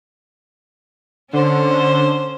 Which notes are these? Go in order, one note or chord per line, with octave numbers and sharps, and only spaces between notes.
D3 C#4 C5